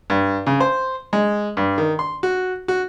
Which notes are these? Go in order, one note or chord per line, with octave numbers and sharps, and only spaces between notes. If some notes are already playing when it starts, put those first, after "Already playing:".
G2
C#3
C5
G#3
G2
D#3
C6
F#4
F#4